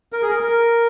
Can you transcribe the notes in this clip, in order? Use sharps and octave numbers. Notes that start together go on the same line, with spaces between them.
A#4
G#4
A#4
A#4